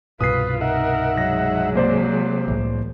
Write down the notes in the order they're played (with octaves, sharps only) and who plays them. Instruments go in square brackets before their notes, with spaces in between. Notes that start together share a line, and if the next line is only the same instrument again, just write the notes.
[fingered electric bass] C2 G2 B2 [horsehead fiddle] F4 B4 [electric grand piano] D#6 C7
[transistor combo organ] D#4 E5 F#5 [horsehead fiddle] A#4
[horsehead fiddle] F#3 G#3 [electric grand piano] A#6
[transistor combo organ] C3 [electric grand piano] A#3 C5 D5
[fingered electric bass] C2 A2 E3